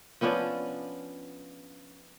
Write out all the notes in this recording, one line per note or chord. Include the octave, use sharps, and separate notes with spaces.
F3 B3 C#4 D4